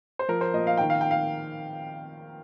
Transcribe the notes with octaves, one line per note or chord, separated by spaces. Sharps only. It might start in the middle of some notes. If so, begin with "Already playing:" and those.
C5
F3 A#4
C5
A#2 D#5
F5
D#3 G5
F5
G5
F5